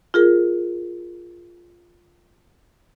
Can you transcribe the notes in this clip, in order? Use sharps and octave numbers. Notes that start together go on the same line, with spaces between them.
F4 G#4 A#4